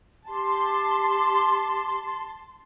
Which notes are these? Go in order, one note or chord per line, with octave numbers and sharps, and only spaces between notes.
G4 A5 C6